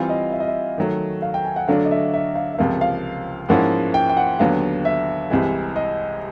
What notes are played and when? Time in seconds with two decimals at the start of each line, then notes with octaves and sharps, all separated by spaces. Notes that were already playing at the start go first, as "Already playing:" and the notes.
Already playing: E3 G3 C4 F4 F5
0.09 D#5
0.32 E5
0.40 D#5
0.48 E5
0.78 D#3 F#3 A3
1.22 F5
1.34 G5
1.45 G#5
1.56 F#5
1.68 D3 F#3 A3 D4 F5
1.85 D#5
1.91 E5
2.14 E5
2.35 F5
2.54 E5
2.58 C#2 C3 F3 A#3 F5
2.81 F5
3.49 G#2 F3 A#3 C#4 E4 F#5
3.94 G5
4.10 G5
4.17 F#5
4.39 D#2 D3 F#3 B3 F5
4.85 E5
5.30 C2 C3 E3 G#3
5.76 D#5